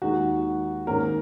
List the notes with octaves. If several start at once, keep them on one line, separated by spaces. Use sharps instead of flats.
D#2 D#3 G#3 D#4 F#4
G#2 D#3 A#3 C#4 A#4